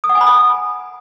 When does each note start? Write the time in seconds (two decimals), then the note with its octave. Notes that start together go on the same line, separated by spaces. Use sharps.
0.04 D#6
0.09 F#5
0.15 G#5
0.21 B5
0.27 D#6